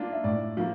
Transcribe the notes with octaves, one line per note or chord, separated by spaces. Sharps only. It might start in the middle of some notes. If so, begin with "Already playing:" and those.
Already playing: A#3 D4 F4
E5
A2 D5
F3 A#3